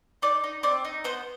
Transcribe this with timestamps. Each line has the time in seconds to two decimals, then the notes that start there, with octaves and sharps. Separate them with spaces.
0.22 D#4 D5
0.44 D#4
0.63 C4 D5
0.84 D#4
1.04 B3 C5